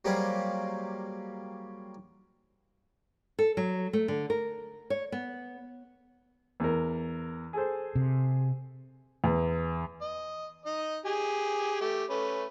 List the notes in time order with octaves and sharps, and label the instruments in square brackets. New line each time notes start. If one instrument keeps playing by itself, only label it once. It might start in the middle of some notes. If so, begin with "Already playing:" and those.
[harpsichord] F#3 G3 A#3 G4 G#4 C5
[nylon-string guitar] A4
F#3
A3
D3
A#4
C#5
B3
[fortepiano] E2 A#4
G#4 A4 C5
[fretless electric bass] C3
[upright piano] E2
[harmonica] D#5
D#4 D#5
G4 G#4 G#5
A3 G4
A3 C#4 B4